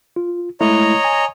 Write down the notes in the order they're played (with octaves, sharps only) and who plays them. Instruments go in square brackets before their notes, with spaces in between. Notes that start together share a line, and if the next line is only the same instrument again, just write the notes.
[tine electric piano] F4
[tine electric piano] G#3 A3 E4 [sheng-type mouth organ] C#5 D#5 A#5
[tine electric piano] G#5